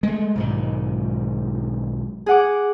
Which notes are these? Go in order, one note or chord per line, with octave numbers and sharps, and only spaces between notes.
G#3 A3
B1 G#2 D#3
G#4 F#5 D6